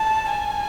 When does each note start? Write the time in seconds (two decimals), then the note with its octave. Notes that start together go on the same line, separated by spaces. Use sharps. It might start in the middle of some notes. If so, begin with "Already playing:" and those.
Already playing: A5
0.31 G#5